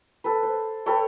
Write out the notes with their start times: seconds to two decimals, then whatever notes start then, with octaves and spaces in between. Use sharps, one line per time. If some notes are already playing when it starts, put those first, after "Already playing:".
0.24 A4 B4
0.43 C5
0.86 A4 B4 C#5 G5